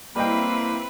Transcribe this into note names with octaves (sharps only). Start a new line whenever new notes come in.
G3 A#3 C4 E4 B4 D#5 G5